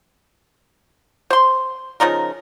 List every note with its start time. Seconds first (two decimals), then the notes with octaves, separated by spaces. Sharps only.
1.30 C5 C6
2.00 C#3 F3 D#4 A#4